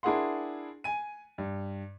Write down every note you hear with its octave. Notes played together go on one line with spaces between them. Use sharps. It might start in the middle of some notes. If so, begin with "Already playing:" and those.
D4 E4 G#4 A#4 F#5 C6
G#5 D#7
G2